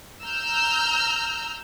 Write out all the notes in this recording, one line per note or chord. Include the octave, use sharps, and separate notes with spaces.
A#5 E6 F6 G6